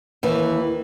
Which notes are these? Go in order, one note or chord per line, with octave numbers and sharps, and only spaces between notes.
D#2 E3